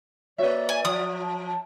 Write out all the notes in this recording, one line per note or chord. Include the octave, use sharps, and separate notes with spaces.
A#3 F#4 C#5 D5 E5
G#5
F3 D#6
A5
A5